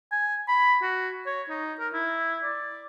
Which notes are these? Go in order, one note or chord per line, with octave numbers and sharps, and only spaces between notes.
G#5
B5
F#4
C#5
D#4
A#4
E4
D5